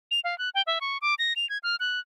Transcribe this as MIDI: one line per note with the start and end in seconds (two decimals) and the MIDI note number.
0.11 0.20 101
0.24 0.37 77
0.38 0.50 90
0.55 0.62 79
0.67 0.79 76
0.81 0.98 85
1.02 1.15 86
1.19 1.33 94
1.36 1.48 101
1.50 1.58 92
1.63 1.76 89
1.80 2.00 90